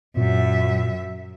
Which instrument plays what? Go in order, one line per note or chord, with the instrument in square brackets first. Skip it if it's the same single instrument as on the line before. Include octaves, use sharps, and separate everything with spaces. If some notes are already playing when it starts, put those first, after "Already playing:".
[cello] F#2 E5 [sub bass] A#2